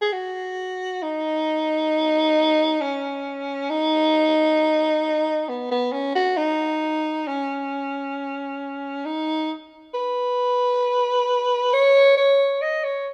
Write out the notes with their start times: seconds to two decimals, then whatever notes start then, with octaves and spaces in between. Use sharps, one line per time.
0.01 G#4
0.12 F#4
1.02 D#4
2.81 C#4
3.69 D#4
5.49 B3
5.71 B3
5.92 C#4
6.15 F#4
6.37 D#4
7.27 C#4
9.05 D#4
9.94 B4
11.73 C#5
12.17 C#5
12.62 D#5
12.84 C#5